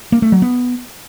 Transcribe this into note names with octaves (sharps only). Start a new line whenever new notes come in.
A#3
A3
F#3
B3